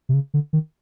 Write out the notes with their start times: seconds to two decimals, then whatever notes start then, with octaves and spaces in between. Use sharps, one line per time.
0.09 C3
0.14 C#3
0.34 D3
0.53 D#3